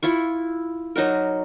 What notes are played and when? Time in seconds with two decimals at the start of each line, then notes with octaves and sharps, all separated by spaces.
0.03 E4 F4 C#6
0.96 F#3 D#4 F#4 A#4